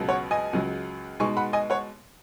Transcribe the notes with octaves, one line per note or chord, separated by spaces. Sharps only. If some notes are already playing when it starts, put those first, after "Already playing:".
Already playing: C#2 B2 F#3
C#5 F#5
D#5 G#5
C#2 C#3 F#3
B2 G#3 D#4 G#5 C#6
F#5 B5
D#5 G#5
C#5 F#5